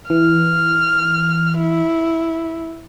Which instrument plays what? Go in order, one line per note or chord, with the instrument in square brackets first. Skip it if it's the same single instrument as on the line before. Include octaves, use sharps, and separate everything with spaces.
[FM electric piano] E3 [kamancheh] F6
[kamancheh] E4